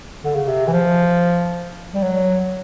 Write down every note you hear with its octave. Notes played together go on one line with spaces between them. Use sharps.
D3
C#3
C3
E3
F3
G3
F#3